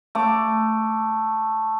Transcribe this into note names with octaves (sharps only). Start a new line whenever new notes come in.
A3 D6